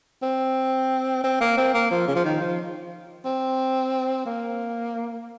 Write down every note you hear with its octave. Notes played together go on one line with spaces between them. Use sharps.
C4
C4
A#3
C4
A#3
F3
C#3
F3
D#3
F3
C4
A#3